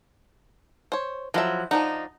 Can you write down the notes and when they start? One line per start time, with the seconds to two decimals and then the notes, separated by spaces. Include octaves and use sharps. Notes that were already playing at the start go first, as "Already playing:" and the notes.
0.92 C5 C#5
1.34 F3 F#3 E4 A4 E5
1.71 F3 D4 D#4 F#5